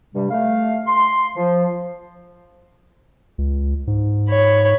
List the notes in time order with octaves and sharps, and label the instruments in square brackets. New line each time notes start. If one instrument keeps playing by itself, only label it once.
[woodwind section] G2 C3 G3
A3 F5
C6
F3
[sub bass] C#2
G#2
[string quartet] C#5 B5